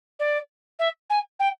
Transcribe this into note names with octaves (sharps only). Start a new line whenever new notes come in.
D5
E5
G#5
G5